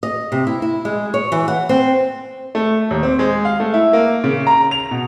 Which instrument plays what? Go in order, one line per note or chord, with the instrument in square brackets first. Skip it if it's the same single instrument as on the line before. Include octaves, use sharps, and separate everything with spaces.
[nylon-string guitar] D#5
C3
E4
E4
G#3
C#5
E3
F#5
C4
[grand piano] A3
D#2
C4
G#3
F5
A3
E4
A#3
C#3
A#5
F7
B2